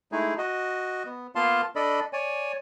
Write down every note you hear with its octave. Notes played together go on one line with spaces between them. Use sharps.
G#3 A3 D#4 E4 G#4
F#4 D#5
B3
A#3 B3 F4 F5 A5 C6
D4 A4 D5 D#5 B5
C#5 D5 G#5